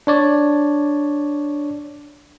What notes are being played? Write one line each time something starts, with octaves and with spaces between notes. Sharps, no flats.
D4 C#5 D5